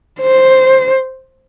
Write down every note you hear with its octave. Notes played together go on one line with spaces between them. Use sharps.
C5